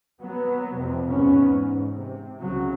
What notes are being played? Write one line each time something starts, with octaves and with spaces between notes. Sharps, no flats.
F#3 B3
F2 C3
E2 G#2 B3 C#4
G#2
C3
C2 C#3 F#3